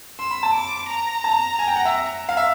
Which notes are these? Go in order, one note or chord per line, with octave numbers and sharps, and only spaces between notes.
C6 E6
B5
A5
D6
A#5
A5
G#5
G5
F#5
E5
F5
E5